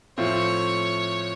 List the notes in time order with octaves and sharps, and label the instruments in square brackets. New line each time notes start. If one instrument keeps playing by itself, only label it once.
[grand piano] A2 F3 A3 C4 F4 [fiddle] C#5